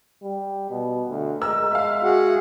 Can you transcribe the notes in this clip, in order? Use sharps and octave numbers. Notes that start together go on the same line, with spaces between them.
G3
B2
D2
G#3 A#4 E6
E5 F5
F#4 G#4 F#5